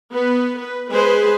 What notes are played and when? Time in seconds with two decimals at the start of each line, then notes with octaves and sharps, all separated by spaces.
0.12 B3 B4
0.58 B4
0.90 G#3 G#4 B4 C5